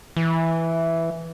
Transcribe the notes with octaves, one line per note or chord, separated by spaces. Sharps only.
E3